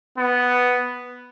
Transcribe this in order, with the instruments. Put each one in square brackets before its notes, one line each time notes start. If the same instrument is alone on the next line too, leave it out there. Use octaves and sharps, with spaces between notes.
[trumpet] B3